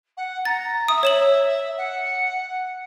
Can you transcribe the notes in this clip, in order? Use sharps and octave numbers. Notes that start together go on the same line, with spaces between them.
F#5
A#5 A6
E5 D#6
C#5 E7 F#7
F#5